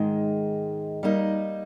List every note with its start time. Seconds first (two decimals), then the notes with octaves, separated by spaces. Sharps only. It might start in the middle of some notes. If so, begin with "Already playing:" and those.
Already playing: G#2 D#3 G#3
1.03 G3 A#3 D#4